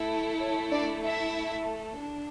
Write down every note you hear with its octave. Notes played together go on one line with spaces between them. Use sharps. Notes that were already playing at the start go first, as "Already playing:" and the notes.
Already playing: A3 E4 A4
C#5
D4 D5
E4 E5
D4